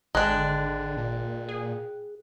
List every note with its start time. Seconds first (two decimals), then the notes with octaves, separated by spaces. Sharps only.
0.15 G#1 D3 G#3 D4 G5 F#6
0.97 A#2
1.48 G#4